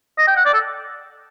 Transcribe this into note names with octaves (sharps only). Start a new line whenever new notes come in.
D#5
G5
F#5
D5
A4